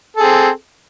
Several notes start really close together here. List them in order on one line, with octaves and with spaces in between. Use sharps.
A4 G#4 C4